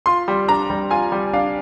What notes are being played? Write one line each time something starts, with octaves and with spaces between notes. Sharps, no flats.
F4 C6
G3
D4 A#5
G3
F4 G#5
G3
D4 F5